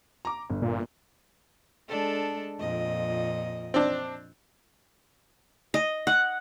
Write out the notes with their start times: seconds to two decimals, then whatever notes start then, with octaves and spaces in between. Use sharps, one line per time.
0.25 A#5 D6
0.50 G1
0.62 A#2
1.89 G#3 D4 A4
2.60 F2 A#2 D#5
3.74 C4 D4
5.74 D#5
6.07 F#5